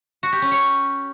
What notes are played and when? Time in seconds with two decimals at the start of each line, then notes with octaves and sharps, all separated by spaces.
0.23 F#4
0.32 G4
0.42 C#4
0.51 C#5